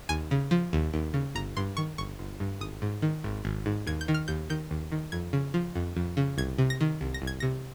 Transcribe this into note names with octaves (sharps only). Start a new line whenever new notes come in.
D#2 G#5
C#3
F3
D#2
D#2
C#3
G1 A#5
G2 C6
D#3 C#6
G1 C#6
G1
G2
G#1 D#6
G#2
D#3
G#1
G#1
G#2
D#2 G#6
G6
D#3
F6
D#2 G6
D#3 G6
D#2
D#3
F2 G#6
C#3
F3
F2
F2
C#3
C2 G#6
C3
A#6
D#3
C2
A#6
C2
G#6
C3 A#6